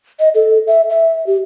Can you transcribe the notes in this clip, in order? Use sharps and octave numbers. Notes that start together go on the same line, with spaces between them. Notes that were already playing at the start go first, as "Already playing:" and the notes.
D#5
A4
E5
E5
G4